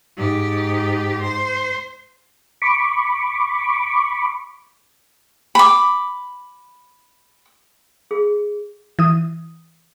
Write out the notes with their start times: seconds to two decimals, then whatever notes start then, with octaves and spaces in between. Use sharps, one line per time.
0.17 G#2 G4
1.22 C5
2.62 B5 C#6 D6
5.55 B5 D6
8.11 G#4
8.99 E3 D#6